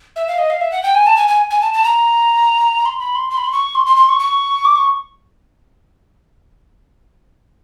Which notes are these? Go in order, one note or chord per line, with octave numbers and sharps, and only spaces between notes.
E5
F5
D#5
F5
E5
F#5
G5
G#5
A5
G#5
G#5
G#5
A5
A5
A#5
C6
B5
C6
C6
B5
C6
C#6
C6
C6
C6
C#6
C#6
D6
C#6